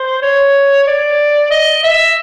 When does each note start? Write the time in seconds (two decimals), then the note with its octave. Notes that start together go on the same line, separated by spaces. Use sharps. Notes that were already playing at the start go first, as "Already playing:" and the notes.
Already playing: C5
0.22 C#5
0.87 D5
1.51 D#5
1.84 E5